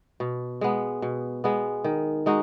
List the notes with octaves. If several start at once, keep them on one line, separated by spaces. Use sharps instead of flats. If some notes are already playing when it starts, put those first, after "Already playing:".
B2
G#3 B3
B2
G#3 B3
D#3
G#3 D#4 F#4